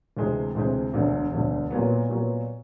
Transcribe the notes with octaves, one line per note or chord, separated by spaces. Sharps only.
D2 C3 E3 G#3 C4
D2 C3 E3 G#3 C4
E1 D2 D3
E1 D2 D3
A#2 F#3 B3
A#2 F#3 B3